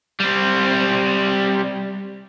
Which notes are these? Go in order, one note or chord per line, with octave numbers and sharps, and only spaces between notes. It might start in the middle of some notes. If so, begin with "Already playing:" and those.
G3 C4